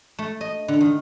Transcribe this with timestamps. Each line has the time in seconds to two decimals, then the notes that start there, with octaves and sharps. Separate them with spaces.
0.19 A3
0.41 D#5
0.68 D3
0.81 D#3